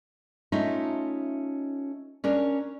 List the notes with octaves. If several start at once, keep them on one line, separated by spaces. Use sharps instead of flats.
A3 C#4 D#4 F4 E5
C#4 D4 A#4